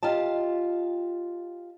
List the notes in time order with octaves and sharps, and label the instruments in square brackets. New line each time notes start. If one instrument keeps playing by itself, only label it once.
[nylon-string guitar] F4 G4 D#5 A5